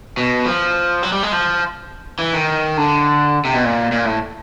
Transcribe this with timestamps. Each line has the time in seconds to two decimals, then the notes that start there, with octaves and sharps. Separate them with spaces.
0.17 B2
0.46 F3
1.03 F#3
1.12 G3
1.23 G#3
1.32 F3
2.19 E3
2.34 D#3
2.77 D3
3.45 C3
3.54 B2
3.64 A#2
3.92 A#2
4.05 A2